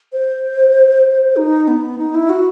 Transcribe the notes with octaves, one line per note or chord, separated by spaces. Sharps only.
C5
D#4
B3
D#4
E4
F#4